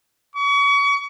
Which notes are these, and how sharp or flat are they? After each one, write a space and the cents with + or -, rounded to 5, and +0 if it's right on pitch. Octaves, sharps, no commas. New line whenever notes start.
C#6 +35